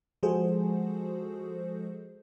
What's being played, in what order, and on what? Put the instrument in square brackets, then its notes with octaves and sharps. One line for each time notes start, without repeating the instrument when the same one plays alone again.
[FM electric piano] F3 G#3 F#4 G#4 A4 C5